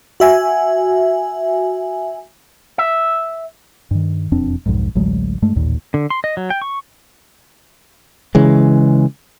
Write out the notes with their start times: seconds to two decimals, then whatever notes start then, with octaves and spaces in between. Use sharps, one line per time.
0.20 F#4 E5 G#5
2.78 E5
3.91 G2 D#3
4.32 E1 F2 C4 D4
4.66 B1 F2 G#2
4.95 A1 D2 F#3 G#3
5.42 G2 G#3 A3
5.56 A1 D#2 A#2
5.94 D3
6.10 C6
6.24 D#5
6.37 F#3
6.50 G5
6.62 C#6
8.35 C#3 E3 G#3